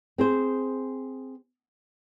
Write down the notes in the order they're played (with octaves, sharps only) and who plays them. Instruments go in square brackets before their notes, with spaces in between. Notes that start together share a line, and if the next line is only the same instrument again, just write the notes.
[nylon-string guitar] C4 G#4 C5